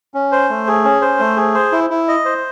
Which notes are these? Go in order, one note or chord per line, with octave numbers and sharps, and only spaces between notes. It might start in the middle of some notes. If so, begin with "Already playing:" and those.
C#4
C5
A3
G#4
C#4
C5
A3
G#4
C5
E4
E4
D#5
C5